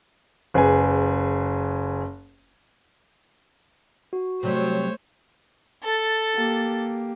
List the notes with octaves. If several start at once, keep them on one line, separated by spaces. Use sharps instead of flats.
F#1 G#4 B4 G#5
F#4
C3 F#3 G3 A3 C5 C#5
A4 A6
A#3 G4